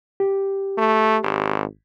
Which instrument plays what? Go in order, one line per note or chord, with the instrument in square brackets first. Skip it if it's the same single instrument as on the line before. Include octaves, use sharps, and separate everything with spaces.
[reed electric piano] G4
[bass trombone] A3
G#1